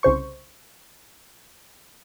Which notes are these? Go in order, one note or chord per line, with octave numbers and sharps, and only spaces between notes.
C2 C#3 C5 C#6